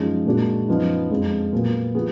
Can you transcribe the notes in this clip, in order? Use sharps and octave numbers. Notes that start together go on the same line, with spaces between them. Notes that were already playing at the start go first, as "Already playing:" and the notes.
Already playing: F#2 F3 G#3 D#4 G#4
A#2 G#3 D4 F#4
F#2 F3 B3 D#4
F2 F3 G#3 D4
A#2 F#3 B3
F3 B3 F4 G#4